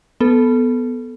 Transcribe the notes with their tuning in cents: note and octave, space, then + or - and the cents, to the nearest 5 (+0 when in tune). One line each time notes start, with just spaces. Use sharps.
B3 +0 A4 -10